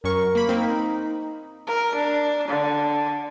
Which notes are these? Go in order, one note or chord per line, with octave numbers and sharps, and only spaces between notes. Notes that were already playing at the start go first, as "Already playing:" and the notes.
F#2 A#4 C#6
A#3 B5
A#3 C4 D#4
A#4
D4
D3